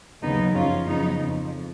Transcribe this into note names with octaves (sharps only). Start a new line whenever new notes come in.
D#2 C#3 F#3 B3 D#4
F#2 F3 C#4 F4
F#2 C#3 F3 B3 D#4
F2 F3